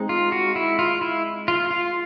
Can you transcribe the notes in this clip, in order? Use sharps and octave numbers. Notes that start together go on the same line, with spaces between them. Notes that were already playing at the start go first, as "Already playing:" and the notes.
Already playing: G#3 C4 D#4
F4
F#4
E4
F4
E4
F4
F4